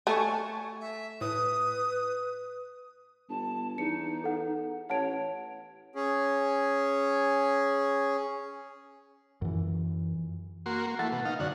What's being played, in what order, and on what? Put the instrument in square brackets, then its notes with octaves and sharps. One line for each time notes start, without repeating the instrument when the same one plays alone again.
[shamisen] A3 [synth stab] G#5 A5 C#6
[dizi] E5
[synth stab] A2 [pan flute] B4 [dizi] D#6
[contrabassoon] G1 [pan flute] A5
[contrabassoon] E2 [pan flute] D#4 [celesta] C#7
[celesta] A4 F#5
[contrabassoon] A1 [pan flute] C#5 [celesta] F#5 A5 D7
[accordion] C#4 G#4
[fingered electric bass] F#2 E3
[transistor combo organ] A#3 F#4 C6
A#3
[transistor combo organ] E3 A3 [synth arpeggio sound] F#5 A6
[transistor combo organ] B2
D#4 F5
[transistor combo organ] F#2 F#5 [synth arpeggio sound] D3 D5